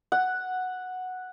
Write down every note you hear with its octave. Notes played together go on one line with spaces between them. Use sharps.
F#5